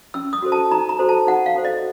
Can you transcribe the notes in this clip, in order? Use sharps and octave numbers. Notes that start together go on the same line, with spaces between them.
C#4 E6
D#6
F#4 A4 C5
A5
D#4 A#5
A#5
F#4 A4 C5
A5
D#4 F#5
F5
F#4 A4 C5
D#5